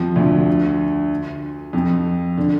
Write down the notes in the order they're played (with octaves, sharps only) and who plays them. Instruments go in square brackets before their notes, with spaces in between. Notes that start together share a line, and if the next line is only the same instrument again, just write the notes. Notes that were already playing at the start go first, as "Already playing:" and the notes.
Already playing: [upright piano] F2 F3
D2 D3
F2 F3
D3